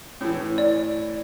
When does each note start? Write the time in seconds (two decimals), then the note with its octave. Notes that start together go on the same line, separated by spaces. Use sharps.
0.21 A2 E3
0.58 D5